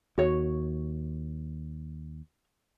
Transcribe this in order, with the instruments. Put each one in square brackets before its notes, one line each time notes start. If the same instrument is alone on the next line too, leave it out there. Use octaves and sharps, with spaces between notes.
[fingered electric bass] D#2 [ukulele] F#4 C#5